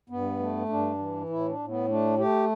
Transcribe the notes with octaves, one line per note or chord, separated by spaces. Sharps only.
G2 B3
A3
G2 D4
E3
A2 E4
D4
A2
B3
A3 D4
A3 G4